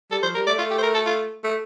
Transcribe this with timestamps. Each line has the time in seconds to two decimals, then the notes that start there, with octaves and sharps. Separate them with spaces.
0.11 G3 A4
0.23 F3 C5
0.35 G3 A#4
0.47 A3 D5
0.58 A3 F4
0.71 G4
0.78 C5
0.82 A#4
0.94 A4
1.06 F4
1.44 A3